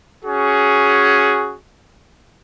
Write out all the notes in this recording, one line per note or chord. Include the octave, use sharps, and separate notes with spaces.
C#4 F#4 G#4